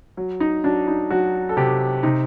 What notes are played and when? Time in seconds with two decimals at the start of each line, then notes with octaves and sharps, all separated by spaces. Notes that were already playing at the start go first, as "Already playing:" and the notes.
0.17 F#3
0.40 D#4
0.64 F#3 D4
0.88 D#4
1.10 F#3 F#4
1.49 A4
1.57 C3 G4
2.03 C3 D#4